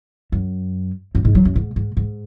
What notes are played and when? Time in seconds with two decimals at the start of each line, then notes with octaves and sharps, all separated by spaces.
0.32 F#2
1.15 F#2
1.25 G#2
1.35 F#3
1.45 F#2
1.55 G#2
1.76 G#2
1.97 G#2